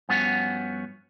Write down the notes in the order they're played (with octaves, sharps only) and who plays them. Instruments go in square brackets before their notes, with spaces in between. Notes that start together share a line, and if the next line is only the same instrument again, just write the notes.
[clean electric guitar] G2 F3 B3 C#4 F#4